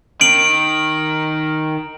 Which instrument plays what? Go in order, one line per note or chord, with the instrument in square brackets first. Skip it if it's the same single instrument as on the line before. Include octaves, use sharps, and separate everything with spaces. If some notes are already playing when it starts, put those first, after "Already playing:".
[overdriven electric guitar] D#3 [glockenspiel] D7 F#7